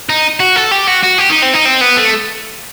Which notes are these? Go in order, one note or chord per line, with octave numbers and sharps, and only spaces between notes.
D#4
F#4
A4
G4
F#4
F#4
G4
D#4
C4
D#4
C4
B3
A3